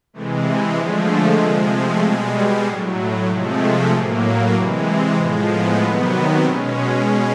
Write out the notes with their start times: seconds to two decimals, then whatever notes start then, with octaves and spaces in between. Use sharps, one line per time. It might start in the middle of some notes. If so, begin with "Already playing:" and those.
0.13 C3 E3 G#3 A3
0.45 G#3
0.76 D3 F3 G#3 A3
1.39 C3 F3 G#3 A#3
1.71 A3
2.03 B2 G3 G#3
2.65 A2 F#3
3.28 C3 F3 G#3 A3
3.91 A2 F#3 A#3
4.54 C3 E3 G#3
5.17 A2 F3 G#3 B3
5.48 B3
5.80 C3 D#3 F#3 B3
6.43 B2 G#3 C#4